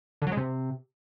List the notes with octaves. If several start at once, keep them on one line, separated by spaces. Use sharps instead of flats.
D3
F#3
G#3
C3